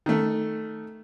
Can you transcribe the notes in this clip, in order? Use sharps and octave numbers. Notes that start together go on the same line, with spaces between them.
D#3 A3